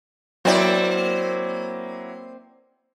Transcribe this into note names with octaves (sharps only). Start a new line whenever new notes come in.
F#3 A#3 C4 E4 D5